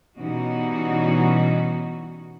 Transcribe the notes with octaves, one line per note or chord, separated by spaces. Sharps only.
B2 E3 G3 C#4 D#4 F#4